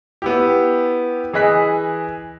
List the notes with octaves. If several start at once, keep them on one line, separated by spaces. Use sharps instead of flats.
B3 E4 G4
E3 G#4 D#5 F#6 B6